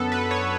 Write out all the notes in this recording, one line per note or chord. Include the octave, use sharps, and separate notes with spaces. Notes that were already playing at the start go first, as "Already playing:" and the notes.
Already playing: F#2 D3 B3 A4
B4
C#5